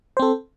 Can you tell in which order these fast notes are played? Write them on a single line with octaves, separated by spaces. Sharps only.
C5 C4 A4